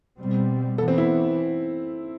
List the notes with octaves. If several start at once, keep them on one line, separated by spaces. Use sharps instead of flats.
B2 G3 C4
E3 B3 A4
C4
E4